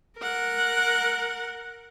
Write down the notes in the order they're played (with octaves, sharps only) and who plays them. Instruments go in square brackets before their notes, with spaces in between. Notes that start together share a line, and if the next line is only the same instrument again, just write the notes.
[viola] A#4 F#5